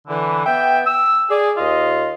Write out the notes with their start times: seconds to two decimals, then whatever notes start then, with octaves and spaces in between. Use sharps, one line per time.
0.08 D3 E3
0.46 B3 E5 G5
0.86 E6
1.30 G#4 D5
1.57 D#2 F4 D#5